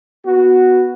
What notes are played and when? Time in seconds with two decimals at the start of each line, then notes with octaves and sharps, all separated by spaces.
0.25 B3 F#4